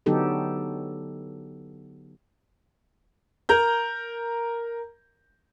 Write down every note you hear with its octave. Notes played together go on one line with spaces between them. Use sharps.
D3 F#3 B3 D#4 G4 A4
A#4 A#5 G6